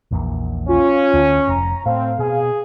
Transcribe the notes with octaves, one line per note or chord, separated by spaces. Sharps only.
A#1 E2 A#2
C#4 F4
D2
F1 A#5
A2 C4 F5
B2 G#4